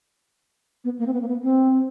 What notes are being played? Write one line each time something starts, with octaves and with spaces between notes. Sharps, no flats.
B3
A#3
C4
B3
A#3
B3
C4